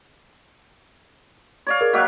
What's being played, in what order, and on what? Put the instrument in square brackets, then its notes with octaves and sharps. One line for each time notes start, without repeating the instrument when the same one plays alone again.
[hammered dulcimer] C#5 D5 F5
[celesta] G#4 A#4
[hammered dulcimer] F#3 A#3 G4 [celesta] D#5 F#6